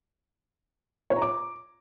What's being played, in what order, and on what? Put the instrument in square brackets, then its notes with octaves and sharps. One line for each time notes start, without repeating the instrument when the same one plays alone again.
[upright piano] C#5
A#5
D6